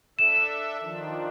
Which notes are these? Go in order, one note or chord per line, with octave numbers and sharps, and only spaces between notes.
D4 A4 E5 E7
D#3 F3 D4